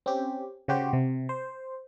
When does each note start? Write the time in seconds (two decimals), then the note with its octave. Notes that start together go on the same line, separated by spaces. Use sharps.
0.06 C4 C#4 G4
0.68 C#3 F#4 G4 C5
0.93 C3
1.29 C5